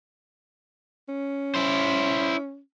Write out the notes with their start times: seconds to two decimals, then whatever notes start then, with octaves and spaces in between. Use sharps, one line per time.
1.08 C#4
1.55 E4 C5